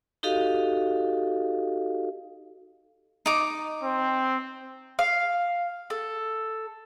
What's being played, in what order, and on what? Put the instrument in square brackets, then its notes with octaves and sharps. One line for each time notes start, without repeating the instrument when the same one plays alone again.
[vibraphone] D#4 F#4 G4 A4 D#5 F5
[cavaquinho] D#4 D6
[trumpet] C4
[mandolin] F5
A4